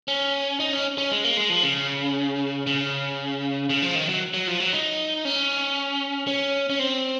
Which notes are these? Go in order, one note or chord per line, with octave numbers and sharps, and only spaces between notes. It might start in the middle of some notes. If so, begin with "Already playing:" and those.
C#4
D#4
C#4
C#4
G#3
A#3
G#3
F3
C#3
C#3
C#3
F3
D#3
F#3
F#3
F3
F#3
D#4
C#4
C#4
C#4
C4